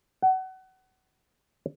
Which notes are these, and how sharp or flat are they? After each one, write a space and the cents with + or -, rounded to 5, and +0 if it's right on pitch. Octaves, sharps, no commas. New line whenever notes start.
F#5 +30